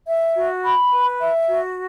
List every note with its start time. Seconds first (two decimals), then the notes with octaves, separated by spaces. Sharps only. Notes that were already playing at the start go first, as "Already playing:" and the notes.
0.07 E5
0.35 F#4
0.64 B5
0.92 B4
1.20 E5
1.49 F#4